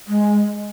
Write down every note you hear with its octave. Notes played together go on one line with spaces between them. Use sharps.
G#3